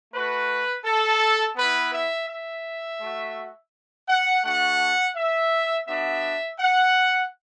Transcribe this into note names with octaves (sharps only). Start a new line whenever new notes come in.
A3 F#4 B4
A4
B3 E4 B4
E5
E5
A3 F#4
F#5
A3 D4 F#4 F#5
E5
B3 D4 F#4 E5
F#5